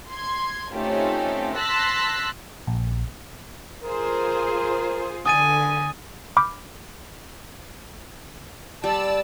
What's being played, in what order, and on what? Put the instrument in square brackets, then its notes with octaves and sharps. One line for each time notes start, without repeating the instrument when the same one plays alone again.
[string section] C6 G#6
A3 C4 C#4 D#4 F4 G4
A5 C6 E6 F#6 A#6 B6
[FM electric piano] A#1
[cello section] F4 G#4 C5 [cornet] A#4
[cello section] D3 [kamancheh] G#5 [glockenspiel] D#6 A6 D#7
[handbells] B5 D6 F6 G6
[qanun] G3 [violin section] D5 A5 E6